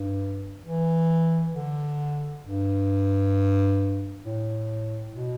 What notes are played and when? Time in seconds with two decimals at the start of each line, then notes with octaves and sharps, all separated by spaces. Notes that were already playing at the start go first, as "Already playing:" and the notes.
Already playing: G2
0.64 E3
1.53 D3
2.44 G2
4.24 A2
5.13 B2